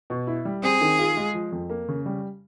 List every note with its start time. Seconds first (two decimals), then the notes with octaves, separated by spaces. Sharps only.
0.10 B2
0.27 E4
0.45 G3
0.63 C4 G#4
0.81 D#3
0.99 F4
1.17 G#3
1.34 F3
1.52 F2
1.70 A#3
1.88 C#3
2.06 G3